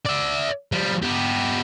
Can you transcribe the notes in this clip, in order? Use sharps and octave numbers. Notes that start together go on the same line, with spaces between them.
D5 E5
F3 G3
B3 G4